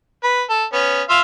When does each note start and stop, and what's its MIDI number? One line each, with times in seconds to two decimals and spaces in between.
0.24 0.42 71
0.49 0.65 69
0.73 1.02 59
0.73 1.02 61
1.09 1.22 65
1.09 1.22 76
1.09 1.22 77